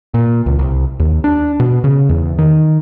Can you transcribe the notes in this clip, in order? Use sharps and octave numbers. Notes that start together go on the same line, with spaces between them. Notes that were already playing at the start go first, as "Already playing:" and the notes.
A#2
C#2
C2
D#2
D4
B2
C#3
E2
D#3